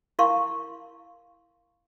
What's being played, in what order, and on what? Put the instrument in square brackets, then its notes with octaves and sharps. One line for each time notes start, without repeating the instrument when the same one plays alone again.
[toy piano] E4 A#4 F5 C6 C#6